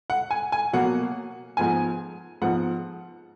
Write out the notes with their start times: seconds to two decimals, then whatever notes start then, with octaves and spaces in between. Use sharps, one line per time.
0.10 F#5
0.31 G#5
0.52 G#5
0.73 B2 F#3 A#3 F#5
1.57 G#2 F3 B3 G#5
2.42 G#2 F3 B3 F#5